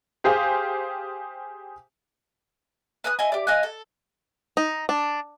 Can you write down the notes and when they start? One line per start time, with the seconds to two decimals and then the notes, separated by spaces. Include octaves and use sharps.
0.24 G4 G#4 C5 F5
3.04 B4 G#5 D#6 F#6
3.19 E4 D#5 G#5
3.32 G4 D5
3.47 D#5 F5 G#5 F#6
3.63 A4
4.57 D#4
4.89 D4